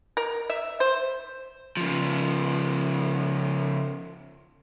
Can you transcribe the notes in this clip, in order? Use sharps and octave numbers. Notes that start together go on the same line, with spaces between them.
A#4
E5
C5
C#3 F3